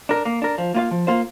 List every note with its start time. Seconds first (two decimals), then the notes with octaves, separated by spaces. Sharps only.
0.09 D4 A#4
0.25 A#3
0.42 D4 A#4
0.58 F3
0.74 A#3 F4 C5 F5
0.91 F3
1.07 A#3 F4 C5 F5